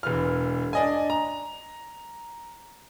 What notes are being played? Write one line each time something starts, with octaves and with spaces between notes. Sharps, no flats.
E1 E3 F6
D4 D#5 G#5
A#5